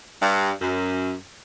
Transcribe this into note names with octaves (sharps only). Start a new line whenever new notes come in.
G2
F#2